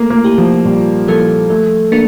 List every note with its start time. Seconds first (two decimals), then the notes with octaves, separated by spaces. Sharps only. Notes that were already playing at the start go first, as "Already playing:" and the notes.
Already playing: A3 A#3
0.10 A#3
0.24 E4 G4
0.38 F3
0.65 A#2 G3
1.08 F3 A#3 E4 A4
1.50 F3 A3
1.92 A#3 D4